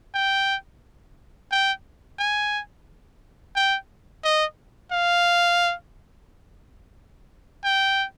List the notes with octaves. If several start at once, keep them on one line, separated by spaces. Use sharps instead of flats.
G5
G5
G#5
G5
D#5
F5
G5